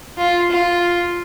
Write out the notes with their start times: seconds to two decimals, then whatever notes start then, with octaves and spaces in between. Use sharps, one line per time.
0.17 F4
0.51 F4